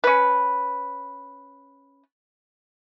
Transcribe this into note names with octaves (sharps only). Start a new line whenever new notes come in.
C#4 B4